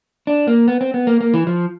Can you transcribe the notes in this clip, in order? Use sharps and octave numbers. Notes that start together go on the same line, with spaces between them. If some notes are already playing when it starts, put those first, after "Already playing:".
D4
A#3
B3
C4
B3
A#3
A#3
E3
F3